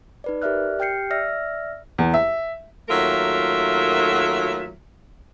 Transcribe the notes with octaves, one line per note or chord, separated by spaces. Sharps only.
D#4 B4 D5
G4 A#4 D5 E5 F6 F#6
G4 G5 F6 G6 C7 C#7
D5 E5 E6 F6 A#6
E2
E5
D#2 F#3 A3 F4 A#4 E5